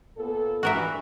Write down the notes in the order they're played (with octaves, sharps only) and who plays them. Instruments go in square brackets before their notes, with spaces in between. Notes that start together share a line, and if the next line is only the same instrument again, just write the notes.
[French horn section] A#2 B3 A4
[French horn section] G2 E3 [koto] F#4 A#4 E5